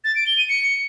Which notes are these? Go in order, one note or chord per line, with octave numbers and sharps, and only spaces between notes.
A6
D7
G7
D#7
C#7